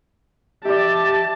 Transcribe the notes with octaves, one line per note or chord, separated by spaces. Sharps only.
G4 D5 E5 A5